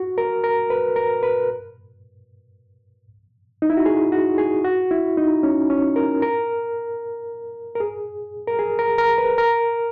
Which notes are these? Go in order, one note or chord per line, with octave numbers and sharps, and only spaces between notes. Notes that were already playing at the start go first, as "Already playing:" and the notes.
Already playing: F#4
A#4
A#4
B4
A#4
B4
D#4
E4
F#4
G#4
F#4
G#4
F#4
E4
D#4
C#4
C#4
A#4
A#4
A#4
G#4
A#4
G#4
A#4
A#4
B4
A#4